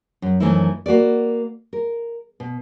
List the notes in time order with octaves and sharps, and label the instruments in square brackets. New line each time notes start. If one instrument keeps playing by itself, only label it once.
[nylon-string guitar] F#2
F#2 E3 F3 A3 D#4 E4
A#3 F#4 B4 D5
A#4
B2